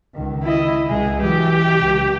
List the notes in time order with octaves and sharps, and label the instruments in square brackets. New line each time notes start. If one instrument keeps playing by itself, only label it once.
[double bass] C#2 D#3
[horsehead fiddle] E4 D#5
[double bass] C#2 G#3 [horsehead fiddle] G#4
[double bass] E3 F#3 [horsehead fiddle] G4
[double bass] C#2